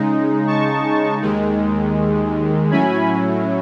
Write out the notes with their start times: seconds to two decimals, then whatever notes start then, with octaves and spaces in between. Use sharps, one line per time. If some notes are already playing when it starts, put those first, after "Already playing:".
Already playing: C#3 G#3 D#4
0.47 A5 C#6
1.22 D#2 D#3 G#3
2.70 A2 F#3 C#4 E4 G#5 B5